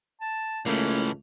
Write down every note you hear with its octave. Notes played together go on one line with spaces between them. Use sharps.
A5
C#2 A2 E3 A3 A#3 C#4